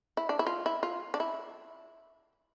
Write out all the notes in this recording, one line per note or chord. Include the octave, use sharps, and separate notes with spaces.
E4
D4
E4
F4
E4
F4
D4
E4